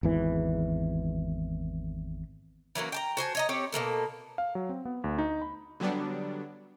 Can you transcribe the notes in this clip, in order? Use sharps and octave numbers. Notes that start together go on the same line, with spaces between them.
G#1 E2 E3
E3 F#3 A#3 C#4
G5 A5 A#5
F#4 C5 G#5 A5
C#5 D#5 A#5
C4 G4 C#5
B2 G3 A#3 A4
F5
F#3
C4
B3
D2
D#4
B5
D3 F#3 G3 B3 D4